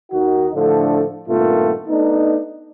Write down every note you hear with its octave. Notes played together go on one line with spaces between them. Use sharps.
D#2 D#3 D#4 F#4
A2 D3 F3 A3 D4
G2 A#2 D#3 A3 B3 F4
A3 B3 D4 D#4